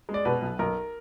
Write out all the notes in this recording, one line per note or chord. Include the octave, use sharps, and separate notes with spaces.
G#3
D5
B2 B4
B1
B1 A#4